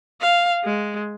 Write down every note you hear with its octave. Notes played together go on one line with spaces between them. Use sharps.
F5
G#3